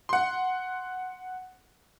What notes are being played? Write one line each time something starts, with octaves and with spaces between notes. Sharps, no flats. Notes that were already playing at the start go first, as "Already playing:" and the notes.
F#5 C6